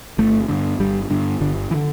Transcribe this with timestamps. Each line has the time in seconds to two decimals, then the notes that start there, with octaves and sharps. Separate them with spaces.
0.18 G1 A3
0.48 G2 D3
0.80 G1 G3
1.10 G2 D3
1.40 G1 D3
1.71 E3
1.75 D3